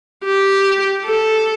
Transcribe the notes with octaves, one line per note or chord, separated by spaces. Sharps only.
G4
A4